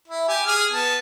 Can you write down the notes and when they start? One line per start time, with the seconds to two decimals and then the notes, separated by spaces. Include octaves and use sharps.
0.08 E4
0.29 G4 G#5
0.46 G#4 G#5 F6
0.72 B3 A5